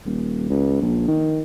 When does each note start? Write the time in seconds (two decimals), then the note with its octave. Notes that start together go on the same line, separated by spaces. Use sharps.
0.05 D#1
0.49 C#2
0.81 A#1
1.08 D#3